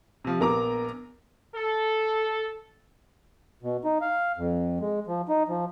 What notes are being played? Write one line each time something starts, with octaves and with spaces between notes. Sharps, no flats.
C3 F3
A#1 B3 A#4 A#5 D6
A4
B2
D#4
F5
F2
G#3
F3
D#4
F3